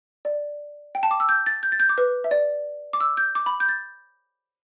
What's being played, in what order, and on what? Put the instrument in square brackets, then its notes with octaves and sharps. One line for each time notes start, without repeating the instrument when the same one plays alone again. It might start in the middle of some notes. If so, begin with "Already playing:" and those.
[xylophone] D5
G5
A5
D6
E6
G6
A6
G6
A6
G6
D6
B4
E5
D5
D6
E6
G6
D6
B5
G6
A6